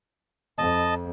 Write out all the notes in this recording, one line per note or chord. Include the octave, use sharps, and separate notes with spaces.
F2 D#5 A5